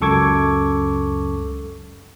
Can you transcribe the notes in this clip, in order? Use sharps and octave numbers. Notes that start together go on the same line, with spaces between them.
C#2 F#2 A4 C#6 D6 G#6